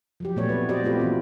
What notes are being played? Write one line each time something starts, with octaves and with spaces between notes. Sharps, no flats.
F3 F#3 G4
A#2 A3 B3 C#5 D5
B3 C4 B4
F#4 G4 C5 D5 D#5
A3 B3 C4 F4 G4 B4
E3 F#3 A#3 C4 F4